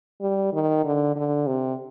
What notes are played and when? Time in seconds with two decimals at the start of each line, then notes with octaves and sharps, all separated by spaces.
0.21 G3
0.53 D#3
0.85 D3
1.15 D3
1.47 C3